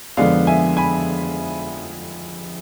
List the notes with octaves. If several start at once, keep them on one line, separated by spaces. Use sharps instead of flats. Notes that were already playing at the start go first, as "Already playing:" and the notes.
F2 D3 G#3 B3 D5 F5
E5 G#5
G#5 B5